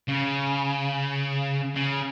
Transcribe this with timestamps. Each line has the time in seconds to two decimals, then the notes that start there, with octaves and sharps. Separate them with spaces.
0.08 C#3
1.75 C#3